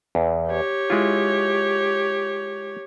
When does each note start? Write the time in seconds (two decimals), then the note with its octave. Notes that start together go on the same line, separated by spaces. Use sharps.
0.15 E2
0.49 G4 C#5
0.90 G#3 E4 F4